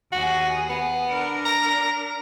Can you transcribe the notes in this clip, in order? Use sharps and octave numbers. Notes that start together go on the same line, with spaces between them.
D#2 F#4 G#4
B3
D4 A#4
A#5